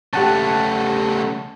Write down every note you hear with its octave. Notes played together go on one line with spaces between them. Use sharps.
C#3 A3 G4 F#5 A5